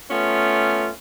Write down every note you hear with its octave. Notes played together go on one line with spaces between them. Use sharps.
A3 B3 C#4 F4